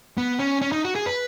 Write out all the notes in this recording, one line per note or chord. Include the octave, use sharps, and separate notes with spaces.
B3
C#4
C#4
D#4
F#4
G#4
B4